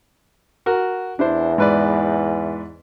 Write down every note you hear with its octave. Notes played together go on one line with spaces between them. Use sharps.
F#4 A#4
E2 D4 E4 C5
G#2 B4 D5